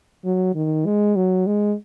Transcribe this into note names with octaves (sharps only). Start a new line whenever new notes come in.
F#3
D#3
G#3
F#3
G#3